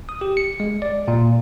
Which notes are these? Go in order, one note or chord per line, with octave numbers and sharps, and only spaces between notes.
D#6
G4
C#7
G#3
D5
A#2